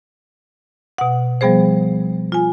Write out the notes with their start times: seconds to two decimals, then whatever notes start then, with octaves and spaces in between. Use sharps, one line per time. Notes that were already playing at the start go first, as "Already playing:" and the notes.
0.98 B2 F#5
1.41 F3 G3 B3 G#4 C5
2.32 F4 G#5